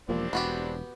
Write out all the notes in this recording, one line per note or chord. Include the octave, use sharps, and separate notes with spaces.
E1 F3 G3 A#3 C4 D4
E1 B3 F#4 G4